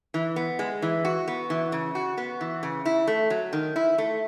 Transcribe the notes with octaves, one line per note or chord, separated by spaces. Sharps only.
E3
B3
G#3
E3
F#4
B3
E3
C#3
F#4
B3
E3
C#3
E4
A3
F#3
D#3
E4
A3